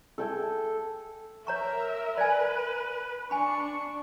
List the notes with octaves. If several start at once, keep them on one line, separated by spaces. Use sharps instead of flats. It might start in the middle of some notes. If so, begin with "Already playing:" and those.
A4 G5 G#5
A#4 C#5 E5 A#5 C#6
B4 D5 G#5
D4 G#5 B5 C#6